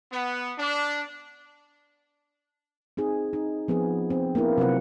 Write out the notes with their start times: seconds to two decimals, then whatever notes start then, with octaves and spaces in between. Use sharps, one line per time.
0.11 B3
0.58 D4
2.97 C4 D#4 G#4
3.33 D#4
3.68 F3 B3 C4 G#4
4.10 C4
4.35 A#3 B3 D4 E4 A#4
4.57 C3 F#3 C4 F4 B4 F#5